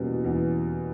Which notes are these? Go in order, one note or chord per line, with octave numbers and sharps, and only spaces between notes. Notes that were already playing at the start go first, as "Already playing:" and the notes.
Already playing: E2 B2 G3 A#3 C#4
E2